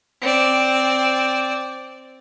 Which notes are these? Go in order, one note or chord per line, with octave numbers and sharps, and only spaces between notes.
C4 D5